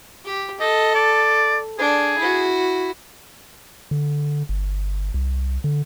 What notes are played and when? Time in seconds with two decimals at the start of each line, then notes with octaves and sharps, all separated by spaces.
0.25 G4
0.60 A4 D#5
0.95 D5
1.78 D4 G#4
2.18 E4 F#4
3.91 D3
4.49 G1
5.14 C2
5.64 D3